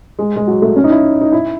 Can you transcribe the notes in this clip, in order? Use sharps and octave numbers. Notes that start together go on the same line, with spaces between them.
G#3
G#3
F#3
A3
C#4
D#4
E4
D#4
E4